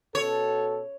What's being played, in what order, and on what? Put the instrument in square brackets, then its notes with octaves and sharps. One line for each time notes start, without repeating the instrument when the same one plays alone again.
[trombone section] B2 F#4 A4 [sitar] C#5